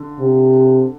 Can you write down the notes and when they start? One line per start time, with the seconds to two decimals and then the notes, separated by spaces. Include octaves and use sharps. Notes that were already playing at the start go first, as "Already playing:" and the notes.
Already playing: D3
0.19 C3